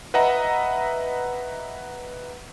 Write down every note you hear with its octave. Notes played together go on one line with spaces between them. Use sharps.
B4 D#5 E5 F#5 A#5